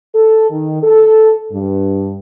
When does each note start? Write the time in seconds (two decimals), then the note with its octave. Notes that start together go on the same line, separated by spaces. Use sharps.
0.14 A4
0.50 D#3
0.82 A4
1.51 G2